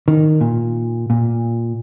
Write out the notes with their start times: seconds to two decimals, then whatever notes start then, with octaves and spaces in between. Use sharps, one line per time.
0.08 D#3
0.41 A#2
1.10 A#2